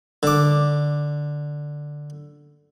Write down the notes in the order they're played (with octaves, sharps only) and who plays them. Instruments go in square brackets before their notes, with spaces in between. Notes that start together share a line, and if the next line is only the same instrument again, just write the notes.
[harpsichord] D3 D6